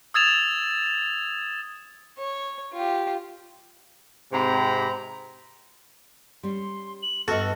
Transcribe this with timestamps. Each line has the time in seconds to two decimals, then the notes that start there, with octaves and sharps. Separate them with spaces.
0.14 D#6 E6 G#6 A6 E7 F7
2.18 C#5
2.73 F4 G4
4.33 G#2 C3 C4 A#5 B5
6.43 G3 C#4 C6
7.03 F#7
7.28 G2 B3 F#4 A4 D#5 F6